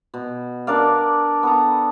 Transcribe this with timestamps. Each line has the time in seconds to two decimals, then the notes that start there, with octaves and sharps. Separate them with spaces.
0.14 B2
0.67 D4 A#4 D5 F5
1.43 B3 A4 A#5